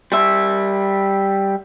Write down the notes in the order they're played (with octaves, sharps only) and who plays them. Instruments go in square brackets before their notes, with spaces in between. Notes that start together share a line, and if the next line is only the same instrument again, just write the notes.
[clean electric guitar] G3 E5